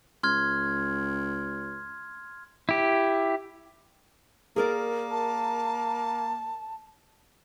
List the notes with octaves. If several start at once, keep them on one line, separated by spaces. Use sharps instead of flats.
C#2 C6 F6 G#6
E4 G4
A#3 G#4 A#4 D5
A5